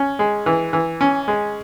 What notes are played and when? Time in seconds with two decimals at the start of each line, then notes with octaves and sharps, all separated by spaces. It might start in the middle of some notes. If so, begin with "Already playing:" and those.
Already playing: C#4
0.19 G#3
0.46 E3
0.73 E3
1.01 C#4
1.28 G#3